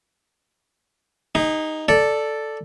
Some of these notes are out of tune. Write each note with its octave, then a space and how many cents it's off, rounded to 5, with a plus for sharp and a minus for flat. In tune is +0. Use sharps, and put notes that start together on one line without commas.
D#4 +0 G#4 -35
A4 +0 D5 +0